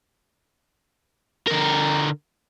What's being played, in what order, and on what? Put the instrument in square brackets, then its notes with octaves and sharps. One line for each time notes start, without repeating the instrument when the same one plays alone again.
[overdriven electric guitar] D3 A#4